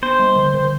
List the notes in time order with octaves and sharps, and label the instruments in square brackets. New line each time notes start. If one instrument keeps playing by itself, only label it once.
[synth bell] B3 [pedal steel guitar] C5
[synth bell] G3
D3
D3